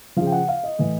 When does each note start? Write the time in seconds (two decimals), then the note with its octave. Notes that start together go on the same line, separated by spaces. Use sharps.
0.16 C#3 F3 F5
0.26 G5
0.32 F#5
0.49 F5
0.64 D#5
0.79 A2 E3